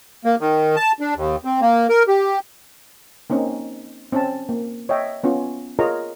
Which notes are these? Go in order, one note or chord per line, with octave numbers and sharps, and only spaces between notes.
A#3
D#3
A5
D4
D#2
C4
A#3
A#4
G4
A#3 C4 C#4 D#4
C4 C#4 A5
A#3
C#5 D#5 E5 G5
B3 C#4 F4
F4 G#4 A#4 C#5 D#5 A#5